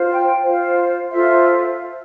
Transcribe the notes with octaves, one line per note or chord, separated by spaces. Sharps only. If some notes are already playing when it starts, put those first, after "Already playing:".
Already playing: F4 C5
G5
F4 C5 F5
F4 A4 C5 E5